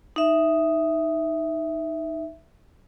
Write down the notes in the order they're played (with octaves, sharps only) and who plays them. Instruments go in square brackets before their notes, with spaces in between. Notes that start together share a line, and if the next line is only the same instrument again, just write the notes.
[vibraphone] D#4 E5